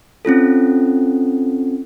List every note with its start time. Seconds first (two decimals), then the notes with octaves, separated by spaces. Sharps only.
0.25 C4 C#4 F4 A4